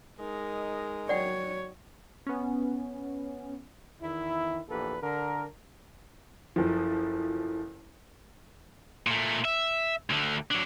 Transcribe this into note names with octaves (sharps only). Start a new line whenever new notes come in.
G#3 D#4 A#4
F#3 C#5 D5 F#5 G5
B3 C#4
E2 D#3 E4
A#1 E2 A#3 G4 A4 B4
D3 D4 A#4
F#1 F3 E4 A4
A#2 A3
E5
D2 D3
F#3 D4